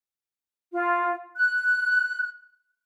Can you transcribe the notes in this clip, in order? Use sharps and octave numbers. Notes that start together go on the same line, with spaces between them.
F4
F#6